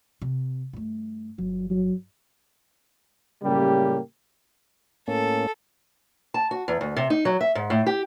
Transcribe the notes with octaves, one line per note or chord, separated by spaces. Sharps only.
C3
G2 A3
G1 F#3
F#3
F#2 A2 C#3 G3 A#3 G4
A2 A#3 C#4 A4
A5
F#4
E2
D2
C3
D#4
F#3
E5
G#2
A2
G4